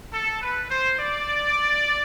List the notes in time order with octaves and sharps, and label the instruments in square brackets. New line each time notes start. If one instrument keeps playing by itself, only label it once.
[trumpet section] A4
B4
C5
D5